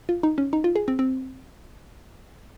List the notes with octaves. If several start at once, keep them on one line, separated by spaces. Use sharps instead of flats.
F4
D#4
C#4
D#4
F4
G#4
C4
C4